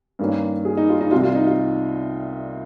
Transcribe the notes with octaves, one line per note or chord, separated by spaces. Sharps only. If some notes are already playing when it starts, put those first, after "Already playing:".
G2 D#3 A#3 C#4
G#4
D#4
F4
D#4
C2 C3 G3 F4
F4
D#4
F4